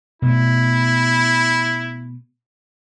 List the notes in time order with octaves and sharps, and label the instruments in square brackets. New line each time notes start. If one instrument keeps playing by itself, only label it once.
[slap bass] B2 A3 [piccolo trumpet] E4